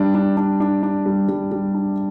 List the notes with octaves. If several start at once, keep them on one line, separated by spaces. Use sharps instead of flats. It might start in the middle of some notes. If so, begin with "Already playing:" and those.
Already playing: G3 D4
D4
D4
D4
D4
G3
G3
G3
D4